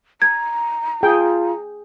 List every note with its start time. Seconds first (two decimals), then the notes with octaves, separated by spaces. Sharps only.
0.22 A#5 G#6
1.03 F4 G#4 G5